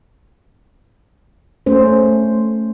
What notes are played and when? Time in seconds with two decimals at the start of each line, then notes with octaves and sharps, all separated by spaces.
1.66 A3 C#4 C5